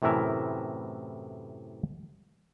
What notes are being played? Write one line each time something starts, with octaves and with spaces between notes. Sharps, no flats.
F#2 A2 C3 E3 A#4 E5